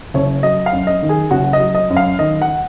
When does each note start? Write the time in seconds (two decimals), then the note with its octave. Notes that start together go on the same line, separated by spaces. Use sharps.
0.14 F#1 C#5
0.43 F#3 D#5
0.66 F5
0.72 F#2
0.87 D#5
1.02 D#3
1.09 G#4
1.31 F#1 F#4
1.53 D#5
1.60 F#3
1.75 D#5
1.90 F#2
1.96 F5
2.19 D#3 D#5
2.41 F#5